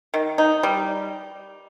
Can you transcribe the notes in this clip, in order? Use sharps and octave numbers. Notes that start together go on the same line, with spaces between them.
D#3
D#4
G3